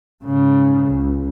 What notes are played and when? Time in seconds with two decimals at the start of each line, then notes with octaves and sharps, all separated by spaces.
0.24 G#2 C#3
0.87 C#2